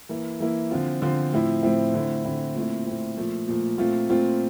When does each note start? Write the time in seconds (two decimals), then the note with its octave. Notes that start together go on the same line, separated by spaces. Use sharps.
0.09 E3 A#3 E4
0.40 E3 A#3 E4
0.71 D3 F3 C4 F4
1.02 D3 F3 C4 F4
1.32 A2 F3 C4 E4
1.63 A2 F3 C4 E4
1.94 D3 A3 C4 E4
2.25 D3 A3 C4 E4
2.55 A#2 A3 C4 E4
2.86 A#2 A3 C4 E4
3.17 A#2 F3 A3
3.48 A#2 F3 A3
3.78 A#2 A3 C4 F4
4.09 A#2 A3 C4 F4